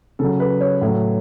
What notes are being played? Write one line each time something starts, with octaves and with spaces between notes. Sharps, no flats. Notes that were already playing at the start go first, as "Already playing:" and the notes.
C#3 F#3 A4
B4
C#5
A2 F#3